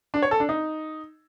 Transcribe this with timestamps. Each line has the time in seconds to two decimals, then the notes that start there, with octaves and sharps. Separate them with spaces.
0.14 D4
0.22 C#5
0.31 A4
0.40 D4
0.49 D#4